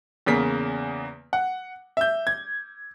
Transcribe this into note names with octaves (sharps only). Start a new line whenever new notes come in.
E2 C#3 A#3 B6
F#5
E5 G6
G#6